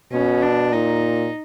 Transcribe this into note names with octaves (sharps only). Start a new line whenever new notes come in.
B2 C#4
D4
A#2 D#4